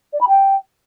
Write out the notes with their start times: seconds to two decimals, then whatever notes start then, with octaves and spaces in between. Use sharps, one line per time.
0.13 D5
0.21 B5
0.28 G5